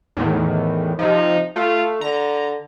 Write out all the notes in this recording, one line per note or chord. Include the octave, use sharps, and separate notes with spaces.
E2 A2 D#3
C3 F3 D#4
A3 F4
D3 A#5